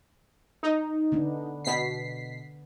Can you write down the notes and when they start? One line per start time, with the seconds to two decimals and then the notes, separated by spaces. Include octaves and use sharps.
0.63 D#4
1.12 D3 B3 D4
1.65 B2 B6 C7